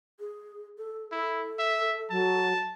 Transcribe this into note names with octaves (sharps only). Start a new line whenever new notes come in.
G#4
A4
E4 A4
E5
F#3 A5